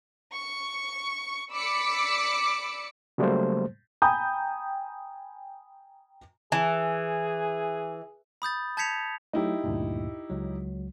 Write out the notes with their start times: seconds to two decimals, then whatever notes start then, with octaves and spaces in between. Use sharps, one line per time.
0.34 C#6
1.52 D5 B5 D6 E6 B6 C#7
3.18 C#3 F#3 G3 A3 A#3 C5
4.02 G5 G#5 A#5 B5 D#6 G6
6.52 E3 G#4
8.42 B5 D#6 G6 A6
8.77 A5 G6 G#6 B6 C#7 F7
9.33 F#3 A3 D#4 E4 G4
9.64 D2 G2 A#2
10.30 C#2 F#3